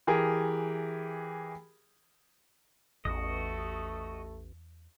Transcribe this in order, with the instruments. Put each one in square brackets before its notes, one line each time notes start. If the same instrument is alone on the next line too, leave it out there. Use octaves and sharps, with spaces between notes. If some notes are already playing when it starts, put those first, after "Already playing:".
[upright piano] E3 G4 G#4 A#4
[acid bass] A1 [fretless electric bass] E2 C#4 [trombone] A3 [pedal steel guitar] F#4 D#5